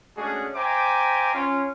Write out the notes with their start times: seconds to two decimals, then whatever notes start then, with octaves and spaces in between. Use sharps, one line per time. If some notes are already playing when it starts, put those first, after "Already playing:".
0.17 G#3 A3 C#4 D4 F#4 G#4
0.55 C5 E5 G5 G#5 A#5 D6
1.34 C#4 F4